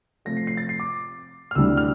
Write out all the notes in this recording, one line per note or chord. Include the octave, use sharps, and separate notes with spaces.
C3 F3 A3 A#6
C7
C7
A6
C7
D6
F6
D2 C3 E3 G3 D4 E6
F6